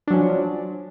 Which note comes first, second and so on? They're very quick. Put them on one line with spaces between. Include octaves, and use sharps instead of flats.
D4 F#3 C#4 F3